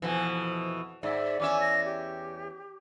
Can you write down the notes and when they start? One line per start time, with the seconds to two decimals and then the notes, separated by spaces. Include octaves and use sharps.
0.02 F2 B2 E3 F3
1.03 G#2 D5 E5
1.40 E2 C#4 E5 D6
1.61 A#6
1.85 G4